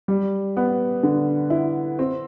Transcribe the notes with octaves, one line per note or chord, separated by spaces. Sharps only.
G3
B3
D3
E4
C4